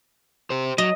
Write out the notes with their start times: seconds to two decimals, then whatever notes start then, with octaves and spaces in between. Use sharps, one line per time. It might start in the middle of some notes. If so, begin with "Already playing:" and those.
0.50 G4 C5
0.78 F#3 D#5